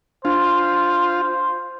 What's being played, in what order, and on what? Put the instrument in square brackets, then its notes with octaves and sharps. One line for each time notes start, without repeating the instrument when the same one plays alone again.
[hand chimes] D4 [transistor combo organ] F4 [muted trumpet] C5